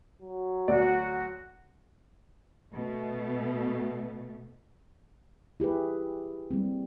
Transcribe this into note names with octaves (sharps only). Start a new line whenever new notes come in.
F#3
D2 F#4 D5
B2 A3
E4 G4 G#4 B4
G3 A#3 C4